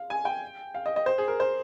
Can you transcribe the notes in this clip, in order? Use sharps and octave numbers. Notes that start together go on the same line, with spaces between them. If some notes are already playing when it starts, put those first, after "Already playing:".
Already playing: F5
G#5
G5
F5
D#5
D#5
C5
G#4
A#4
C5